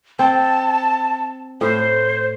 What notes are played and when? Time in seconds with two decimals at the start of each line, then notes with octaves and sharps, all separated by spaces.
0.19 C4 A5
1.61 A2 C5